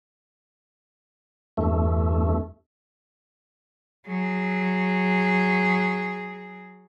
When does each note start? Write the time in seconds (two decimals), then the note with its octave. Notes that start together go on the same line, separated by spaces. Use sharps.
1.57 E2 G2 A3
4.08 F#3 G#4